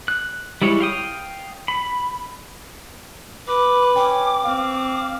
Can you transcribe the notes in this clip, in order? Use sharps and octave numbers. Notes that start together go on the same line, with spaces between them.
F#6
G3 G#3 E4 C#5
F5 G5 D#6
B5
B4 D6
C#4 G5 D6
C4 F5